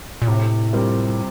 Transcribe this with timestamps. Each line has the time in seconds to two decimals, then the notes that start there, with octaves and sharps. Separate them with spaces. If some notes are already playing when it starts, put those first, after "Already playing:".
0.22 A#2
0.27 A2 C3
0.73 G3 C4 G4 A#4